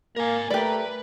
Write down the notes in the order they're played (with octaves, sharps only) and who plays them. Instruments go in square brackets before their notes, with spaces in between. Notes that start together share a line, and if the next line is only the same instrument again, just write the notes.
[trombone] A#3 [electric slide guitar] A#4 G#5
[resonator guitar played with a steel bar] G3 A#4 [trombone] A3 [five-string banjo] G4 D5 [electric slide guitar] B4